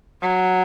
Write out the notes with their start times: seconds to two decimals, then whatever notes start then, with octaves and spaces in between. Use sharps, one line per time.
0.21 F#3